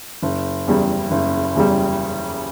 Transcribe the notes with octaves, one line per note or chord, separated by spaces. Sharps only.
F#1
E2 C#3 G3
F#1
E2 C#3 G3